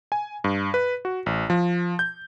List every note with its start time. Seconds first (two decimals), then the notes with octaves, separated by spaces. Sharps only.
0.12 G#5
0.44 G2
0.74 B4
1.05 F#4
1.26 A1
1.50 F3
1.99 G6